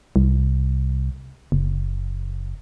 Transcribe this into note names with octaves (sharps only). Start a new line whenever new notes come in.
C2
F#1